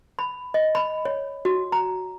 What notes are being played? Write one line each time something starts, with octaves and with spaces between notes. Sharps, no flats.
B5
D#5
B5
C#5
F#4
A#5